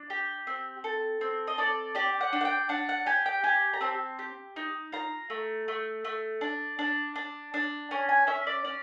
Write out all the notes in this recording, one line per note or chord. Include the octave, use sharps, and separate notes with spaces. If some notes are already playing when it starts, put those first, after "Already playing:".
Already playing: D4
G4
C4
A4
C4
D#5
A4 D5
G4 D5
F#5
D4
F#5
G5
D4 F#5
F#5
G4 G#5
G5
G4 G#5
A#5
C4 A5
G4
D#4
F4 A#5
A3
A3
A3
D4
D4
D4
D4
C#4 G#5
G#5
C#4 E5
D5
C#4 D5